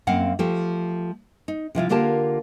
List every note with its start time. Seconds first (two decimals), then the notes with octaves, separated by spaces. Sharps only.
0.07 F#2 A#3 C4 F5 F#5
0.39 F3 A3 G4
1.48 D#4
1.75 C3 F3 E4 F4
1.90 D3 A#3 F4 G4 A#4 A5